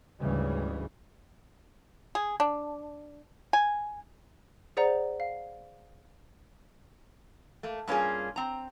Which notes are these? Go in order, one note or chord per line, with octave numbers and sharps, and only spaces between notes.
D2 G#2 C#3 E3 G3 G#3
G#4
D4
G#5
G#4 C5 D5 F#5 A#5
F5
A3 A#3
G2 A#3 C#4 F4 G#4
C4 A#5